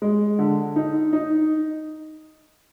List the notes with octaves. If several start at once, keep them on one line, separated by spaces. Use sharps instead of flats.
G#3
D3
D#4
D#4